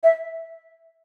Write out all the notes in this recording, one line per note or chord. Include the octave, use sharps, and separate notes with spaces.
E5